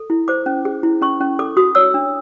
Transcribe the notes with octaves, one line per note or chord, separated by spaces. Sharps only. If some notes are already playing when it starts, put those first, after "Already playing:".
Already playing: A4
E4
C5 D6
C#4
G#4
E4
C#4 C#6
C#4
A4 D6
F#4 D#6
C#5 E6
D4